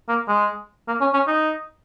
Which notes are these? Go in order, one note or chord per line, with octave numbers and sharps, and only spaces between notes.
A#3
G#3
A#3
C#4
C#4
D#4